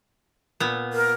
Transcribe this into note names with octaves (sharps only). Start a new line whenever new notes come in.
A#2 B3
A#4